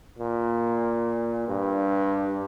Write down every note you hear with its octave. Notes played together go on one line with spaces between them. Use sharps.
A#2
G2